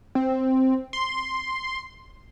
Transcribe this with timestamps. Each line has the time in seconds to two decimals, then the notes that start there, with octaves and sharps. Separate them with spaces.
0.15 C4
0.93 C6